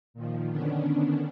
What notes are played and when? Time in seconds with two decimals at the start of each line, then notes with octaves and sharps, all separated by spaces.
0.14 A#2 D#3 F3
0.51 D3 D#3 B3 C#4 D4